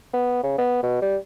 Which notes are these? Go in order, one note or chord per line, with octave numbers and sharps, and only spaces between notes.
B3
C#3
B3
B2
G3